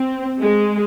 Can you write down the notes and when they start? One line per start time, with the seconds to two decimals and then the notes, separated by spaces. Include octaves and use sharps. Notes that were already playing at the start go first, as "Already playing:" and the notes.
Already playing: C4
0.43 G#3